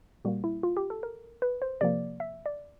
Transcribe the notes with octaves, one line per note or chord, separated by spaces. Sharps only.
A#2 G3 A#3 F#4
E4
F4
G4
A4
A#4
B4
C5
C3 F3 A#3 D5
E5
D5